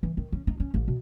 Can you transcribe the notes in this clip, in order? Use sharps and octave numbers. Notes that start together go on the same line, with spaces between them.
E3
D#3
C#4
D#4
C#4
A1
B2